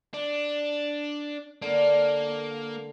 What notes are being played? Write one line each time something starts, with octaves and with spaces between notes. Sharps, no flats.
D4
D3 A#3